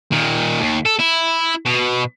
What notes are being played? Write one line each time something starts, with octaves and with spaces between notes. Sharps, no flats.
A#2 D#3
D#2
A4
E4
B2